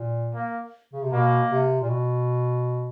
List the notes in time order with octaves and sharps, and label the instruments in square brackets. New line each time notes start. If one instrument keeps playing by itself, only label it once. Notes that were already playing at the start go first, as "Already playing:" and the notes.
Already playing: [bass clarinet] A#2
[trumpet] A#3
[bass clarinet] C#3
C3
[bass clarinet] B2 [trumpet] A#3
[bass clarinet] C3
A#2
B2